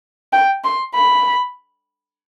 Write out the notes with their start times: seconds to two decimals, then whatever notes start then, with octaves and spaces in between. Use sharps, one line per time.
0.33 G5
0.64 C6
0.95 B5